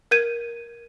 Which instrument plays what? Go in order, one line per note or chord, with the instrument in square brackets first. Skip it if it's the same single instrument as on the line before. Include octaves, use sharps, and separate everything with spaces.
[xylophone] A#4 G6 G#6 D#7